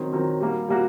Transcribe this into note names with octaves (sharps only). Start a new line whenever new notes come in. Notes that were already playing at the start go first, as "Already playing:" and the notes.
Already playing: D#3 F#3 C4
D#3 F#3 C4
G3 A#3 F#4
G3 A#3 F#4